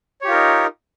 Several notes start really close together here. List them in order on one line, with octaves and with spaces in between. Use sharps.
C#5 G4 F4 A#4 D#4